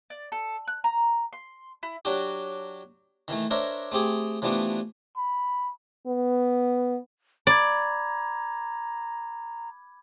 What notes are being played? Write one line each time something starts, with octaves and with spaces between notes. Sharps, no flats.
D5
A4
F#6
A#5
C6
E4
F#3 D4 F#4 G4
D#3 E3 A3
D4 A#4 C5 C#5 E5
A3 C4 G4 G#4
E3 F3 G3 A3 B3 D4
B5
B3
D5 A#5 B5 D6 G#6